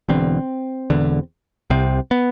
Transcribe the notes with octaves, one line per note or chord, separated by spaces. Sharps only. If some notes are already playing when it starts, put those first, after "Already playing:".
E1 E2 D3 C4
E1 E2 D3
C2 C3 C4
B3